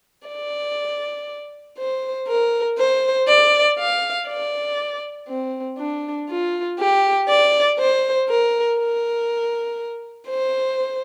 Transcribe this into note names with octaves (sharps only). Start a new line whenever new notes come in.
D5
C5
A#4
C5
D5
F5
D5
C4
D4
F4
G4
D5
C5
A#4
A#4
C5